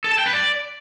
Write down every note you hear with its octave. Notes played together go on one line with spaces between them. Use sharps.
A4
A5
G5
B4
D5